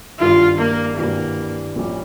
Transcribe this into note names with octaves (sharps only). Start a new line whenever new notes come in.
G#1 G2 E3 G3 F4
A#3
G#1 G2 E3 G3 A#3
A#1 A#2 G3 C#4 G4